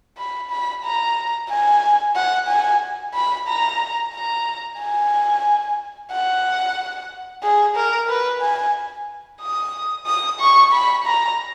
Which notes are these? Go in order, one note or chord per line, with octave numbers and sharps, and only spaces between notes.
B5
B5
A#5
G#5
F#5
G#5
B5
A#5
A#5
G#5
F#5
G#4
A#4
B4
G#5
D#6
D#6
C#6
B5
A#5